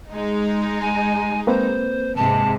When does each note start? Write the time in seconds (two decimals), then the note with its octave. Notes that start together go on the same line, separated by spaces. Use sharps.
0.12 G#3 D#4
0.81 G#5
1.47 A#3 C4 B4 C5
2.16 G#2 C3 G#3 A5